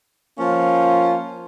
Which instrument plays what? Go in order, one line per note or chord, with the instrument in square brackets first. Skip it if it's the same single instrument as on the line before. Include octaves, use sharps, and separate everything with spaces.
[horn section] F3 A#3 C#4 F4